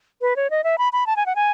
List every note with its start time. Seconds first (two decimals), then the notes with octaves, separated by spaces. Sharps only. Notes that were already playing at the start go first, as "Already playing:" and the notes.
0.21 B4
0.36 C#5
0.50 D#5
0.64 E5
0.78 B5
0.93 B5
1.06 A5
1.16 G#5
1.26 F#5
1.36 G#5